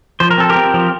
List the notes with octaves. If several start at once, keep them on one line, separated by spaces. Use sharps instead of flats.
F3 C5
A#4
C4 A4
G4 A#4
C4
F3